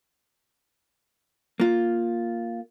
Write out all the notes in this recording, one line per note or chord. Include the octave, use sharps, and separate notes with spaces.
A#3 F4